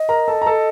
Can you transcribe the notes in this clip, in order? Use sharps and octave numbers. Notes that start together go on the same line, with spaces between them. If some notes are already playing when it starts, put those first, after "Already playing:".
Already playing: D#5
A#4 A#5
A4 A5
A#5
A4 A5